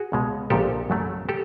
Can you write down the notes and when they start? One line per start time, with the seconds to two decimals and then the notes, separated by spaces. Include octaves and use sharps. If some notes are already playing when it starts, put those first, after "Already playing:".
Already playing: F#4 G#4
0.12 C#2 B2 G#3
0.50 A#1 A#2 F3 G4 A4
0.90 F#2 C#3 F#3 A3
1.29 G4 A4